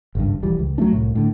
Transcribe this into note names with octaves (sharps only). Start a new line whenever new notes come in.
G#1 C#2 G2
E1 E3 F3 G3
C#2
F#3 A3 D4
C2 A2
A2 D3